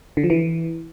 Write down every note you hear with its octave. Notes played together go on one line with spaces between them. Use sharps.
D3
F3
E3